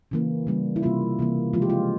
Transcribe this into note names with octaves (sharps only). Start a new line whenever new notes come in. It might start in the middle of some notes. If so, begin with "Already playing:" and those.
C#3 E3 A#3
C#3 G3 A#3
E4
C3 G3 A#3 F4
C3 E3 A#3
C#3 F3 G#3 F4
G4
F4